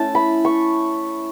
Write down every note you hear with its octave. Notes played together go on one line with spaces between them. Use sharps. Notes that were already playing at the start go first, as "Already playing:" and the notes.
Already playing: A3 C#4 E4 A5
B5
C#6